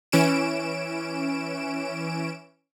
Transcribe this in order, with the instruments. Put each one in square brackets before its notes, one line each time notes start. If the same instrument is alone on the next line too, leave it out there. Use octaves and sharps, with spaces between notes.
[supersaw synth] E3 C#4 D7 E7